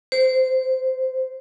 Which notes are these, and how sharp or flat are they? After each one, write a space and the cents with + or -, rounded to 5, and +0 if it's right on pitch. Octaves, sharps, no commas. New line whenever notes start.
C5 -15